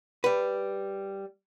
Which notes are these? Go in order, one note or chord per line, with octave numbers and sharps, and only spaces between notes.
G3 B4